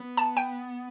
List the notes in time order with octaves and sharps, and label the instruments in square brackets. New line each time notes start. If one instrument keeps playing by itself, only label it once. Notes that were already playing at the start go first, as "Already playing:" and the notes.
Already playing: [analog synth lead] B3
[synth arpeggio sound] A5
G5